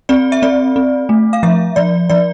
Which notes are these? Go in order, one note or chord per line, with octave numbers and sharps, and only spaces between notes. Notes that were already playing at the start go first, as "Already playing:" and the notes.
C4 D5
E5
C4 D5
C4
A3
F5
F3 E5
F3 D5
F3 D5